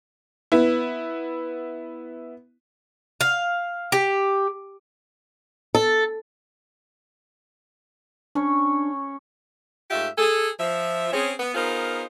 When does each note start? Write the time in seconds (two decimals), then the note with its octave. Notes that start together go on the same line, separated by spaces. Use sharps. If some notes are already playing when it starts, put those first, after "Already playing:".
0.52 B3 E4
3.21 F5
3.92 G4
5.75 A4
8.35 C#4 D4 C#5
9.90 G#2 A3 F4 G4 E5
10.18 G#4 A4
10.60 F3 E5
11.13 C4 C#4 G#4
11.39 B3
11.54 B3 D#4 F4 G#4 A#4 C5